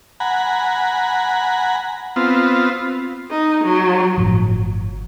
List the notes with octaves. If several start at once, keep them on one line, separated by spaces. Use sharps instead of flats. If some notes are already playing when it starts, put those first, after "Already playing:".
F#5 G#5 A#5 B5
B3 C4 F4
D#4
F#3
G1 A2 F3